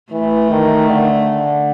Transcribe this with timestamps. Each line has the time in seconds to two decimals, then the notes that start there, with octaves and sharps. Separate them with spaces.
0.12 E3 A3
0.51 D#3
0.89 D3